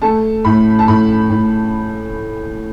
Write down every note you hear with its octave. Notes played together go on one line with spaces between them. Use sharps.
A3 A5
A2 B5
A5
A2 B5
A2